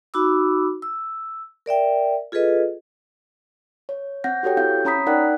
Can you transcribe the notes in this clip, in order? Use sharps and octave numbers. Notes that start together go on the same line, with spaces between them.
D#4 F#4 B5 D6 E6
E6
A#4 D5 E5 G5
F4 G#4 A4 B4 D#5
C#5
C4 F#5 G6 A#6
F#4 G4 A4 C#5 G5
C4 E4 F5 G6
C#4 C#5 A#5 B5 D#6 B6
D#4 A#4 D5 F#5 G5 F#6